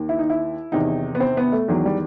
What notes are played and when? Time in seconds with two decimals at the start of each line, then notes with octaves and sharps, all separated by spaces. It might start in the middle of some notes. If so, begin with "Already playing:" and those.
Already playing: D#2 D#3
0.09 E4
0.19 D#4
0.30 E4
0.72 E2 C3 D#3 D#4
1.15 B3
1.20 C4
1.37 B3
1.52 A3
1.68 E2 D#3 F#3
1.85 G3